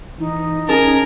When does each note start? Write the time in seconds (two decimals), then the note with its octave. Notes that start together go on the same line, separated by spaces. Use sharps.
0.19 E3 D#4
0.68 C#4 G#4 A#4 G#5 A5